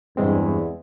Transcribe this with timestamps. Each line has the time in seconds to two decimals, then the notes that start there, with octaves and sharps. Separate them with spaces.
0.17 E2 G2 G#3 C4